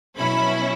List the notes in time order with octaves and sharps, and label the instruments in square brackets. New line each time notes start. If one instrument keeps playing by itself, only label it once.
[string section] B2 F#3 C#4 E4 B5